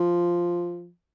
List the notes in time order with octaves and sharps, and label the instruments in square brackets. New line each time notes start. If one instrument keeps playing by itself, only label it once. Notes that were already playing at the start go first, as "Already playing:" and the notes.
Already playing: [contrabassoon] F3